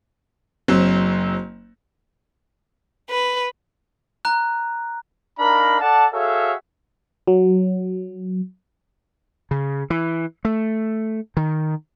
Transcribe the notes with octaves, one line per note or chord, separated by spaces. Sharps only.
F#1 F#3 C4
B4
A#5 F#6
D4 D#4 A#4 F5 A#5 B5
A4 D5 F#5 A5
F#4 G#4 A4 C#5 E5 F5
F#3
C#3
E3
A3
D#3